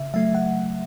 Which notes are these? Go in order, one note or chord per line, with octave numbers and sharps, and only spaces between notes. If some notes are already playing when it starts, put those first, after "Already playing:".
Already playing: C#3 E5
F#3 A3 E5
F#5